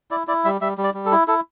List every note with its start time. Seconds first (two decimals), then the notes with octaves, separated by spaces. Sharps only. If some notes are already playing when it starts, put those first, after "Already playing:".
0.11 E4 D5
0.27 E4 D5
0.45 G3 E5
0.61 G3 E5
0.78 G3
0.84 D5
0.94 G3
1.06 A4
1.12 E4
1.28 E4 A4